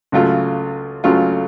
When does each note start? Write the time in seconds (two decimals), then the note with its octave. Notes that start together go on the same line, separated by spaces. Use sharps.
0.12 C#2 C#3 F#3 A3 F4
1.04 C#2 C#3 F#3 A3 F4